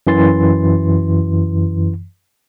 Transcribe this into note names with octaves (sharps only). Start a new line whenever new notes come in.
F#2 E3 C6 A6